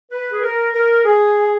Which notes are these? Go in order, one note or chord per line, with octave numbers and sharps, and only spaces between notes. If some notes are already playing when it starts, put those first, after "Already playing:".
B4
G#4
A#4
A#4
G#4